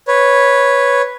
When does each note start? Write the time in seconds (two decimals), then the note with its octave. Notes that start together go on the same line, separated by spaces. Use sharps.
0.08 B4 C#5